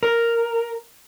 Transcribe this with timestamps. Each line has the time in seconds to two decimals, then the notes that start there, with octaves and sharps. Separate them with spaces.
0.03 A#4